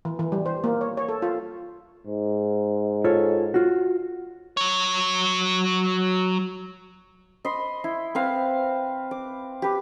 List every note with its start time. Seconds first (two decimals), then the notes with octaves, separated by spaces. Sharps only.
0.05 E3
0.19 E3
0.32 G3
0.46 C5
0.64 A#3
0.81 C#5
0.97 C#5
1.09 A4
1.22 F4
2.07 G#2
3.04 F4 A4 C#5
3.54 F4 F#4
4.57 F#3 C#5
7.45 D#5 B5 C6
7.84 E4
8.15 C4 B4 F5
9.11 D6
9.62 G4 B4